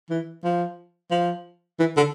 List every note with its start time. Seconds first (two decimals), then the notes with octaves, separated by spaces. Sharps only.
0.10 E3
0.44 F3
1.11 F3
1.79 E3
1.97 D3